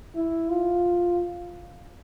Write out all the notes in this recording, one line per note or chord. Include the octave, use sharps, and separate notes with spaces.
E4
F4